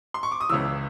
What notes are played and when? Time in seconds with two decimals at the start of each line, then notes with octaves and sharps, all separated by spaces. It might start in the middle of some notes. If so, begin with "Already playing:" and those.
0.14 C6
0.23 C#6
0.32 D6
0.41 D#6
0.49 C#2 C#3 E3 E6